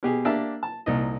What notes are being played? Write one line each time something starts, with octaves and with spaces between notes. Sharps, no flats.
B2 G4 G#4
A#3 D4 G4 E5 A5
A5
C2 A#2 D#4 D#5